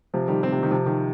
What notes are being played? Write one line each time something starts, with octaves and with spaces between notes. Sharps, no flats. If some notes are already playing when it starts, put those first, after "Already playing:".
C3 F3
D#3 G3
G3 C4
C3
D#3
C3 F3
D#3